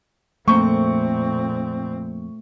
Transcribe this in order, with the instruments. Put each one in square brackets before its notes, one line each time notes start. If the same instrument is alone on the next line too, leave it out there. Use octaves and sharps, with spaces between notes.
[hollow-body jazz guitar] F2 A#3 C5 [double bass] A#2 C4 [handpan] A3 [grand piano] C#6